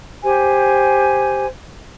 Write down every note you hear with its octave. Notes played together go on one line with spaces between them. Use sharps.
G4 C5 G#5